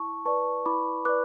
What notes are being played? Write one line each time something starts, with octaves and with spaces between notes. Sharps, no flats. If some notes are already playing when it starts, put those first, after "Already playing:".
Already playing: E4 A5 C#6
B4 D5 A5 C#6
E4 B5 D6
B4 D5 D6 F#6